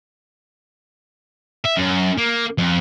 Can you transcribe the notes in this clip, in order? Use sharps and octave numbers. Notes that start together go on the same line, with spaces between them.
E5
F#2
A#3
F2